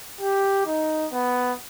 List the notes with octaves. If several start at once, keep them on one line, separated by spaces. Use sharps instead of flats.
G4
D#4
B3